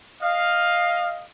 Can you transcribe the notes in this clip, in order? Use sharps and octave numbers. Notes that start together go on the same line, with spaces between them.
D#5 F5